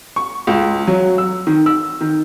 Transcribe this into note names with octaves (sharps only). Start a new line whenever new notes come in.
C#6
C#2
F#3
E6
D#3
E6
D#3